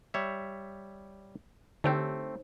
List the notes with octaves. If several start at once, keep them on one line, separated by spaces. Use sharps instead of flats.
G3 C#5 E5
D3 A3 C4 D#4 G4 C5 C#5